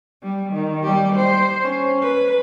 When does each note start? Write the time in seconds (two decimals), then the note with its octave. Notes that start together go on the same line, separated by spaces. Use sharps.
0.22 G3
0.52 D#3
0.83 G3 G4
1.15 C5
1.62 C#4
2.02 B4